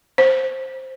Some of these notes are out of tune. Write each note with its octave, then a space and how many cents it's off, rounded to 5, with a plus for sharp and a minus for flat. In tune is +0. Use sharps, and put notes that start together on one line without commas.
C5 +10